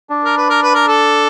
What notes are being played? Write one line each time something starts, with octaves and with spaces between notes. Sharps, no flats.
D4
A#4
B4
A#4
B4
A#4
A4